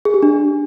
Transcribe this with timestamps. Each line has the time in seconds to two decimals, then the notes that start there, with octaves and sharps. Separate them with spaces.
0.05 G#4
0.14 G4
0.23 D4